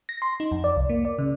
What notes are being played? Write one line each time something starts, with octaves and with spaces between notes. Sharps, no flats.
A#6
C6
D#4
F2
D5
C2
A#3
D5
C#3